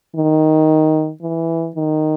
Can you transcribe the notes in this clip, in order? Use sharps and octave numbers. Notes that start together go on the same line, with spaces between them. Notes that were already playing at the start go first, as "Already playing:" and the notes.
D#3
E3
D#3